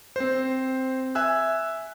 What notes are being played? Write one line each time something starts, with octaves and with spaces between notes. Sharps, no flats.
C4 C5
E5 G#5 E6 F#6